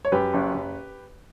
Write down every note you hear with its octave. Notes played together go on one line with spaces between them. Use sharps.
C#5
F#2 G4 B4
F#1
F#1